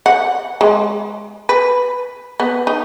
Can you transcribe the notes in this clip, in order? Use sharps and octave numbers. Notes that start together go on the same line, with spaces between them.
F#5
G#3
B4
B3
D#4